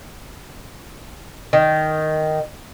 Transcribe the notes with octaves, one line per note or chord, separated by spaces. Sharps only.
D#3